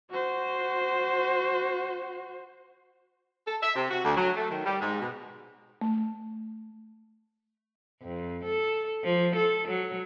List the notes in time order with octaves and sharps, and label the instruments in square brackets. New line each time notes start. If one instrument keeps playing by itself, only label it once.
[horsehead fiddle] F#4 C5
[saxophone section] A4
E5
C3
F#4
D2
F#3
A3
D#3
G3
G#2
B2
[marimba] A3
[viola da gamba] F2
A4
F3
A4
F#3